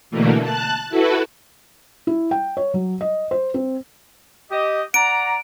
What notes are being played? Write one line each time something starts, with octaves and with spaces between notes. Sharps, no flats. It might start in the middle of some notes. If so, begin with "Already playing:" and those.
B2 D3 E3 A3 A#3
A5 F#6
E4 F#4 A4 B4
E4
G5
C#5
F#3
D#5
C5
C4
G4 D#5
D5 F#5 A#5 D7